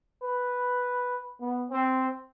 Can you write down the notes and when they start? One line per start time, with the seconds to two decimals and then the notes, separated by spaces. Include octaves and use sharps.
0.23 B4
1.41 B3
1.70 C4